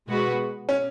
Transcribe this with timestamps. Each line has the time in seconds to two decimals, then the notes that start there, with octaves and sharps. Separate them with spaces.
0.08 B2 G#3 B3 F#4 B4
0.69 C#4